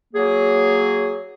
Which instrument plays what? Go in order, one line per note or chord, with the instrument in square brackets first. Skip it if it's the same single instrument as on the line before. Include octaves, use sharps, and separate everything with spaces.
[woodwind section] F#3 A#3 G#4